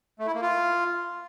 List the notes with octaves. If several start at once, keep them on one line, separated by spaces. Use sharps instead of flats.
A3
E4
A#3
F4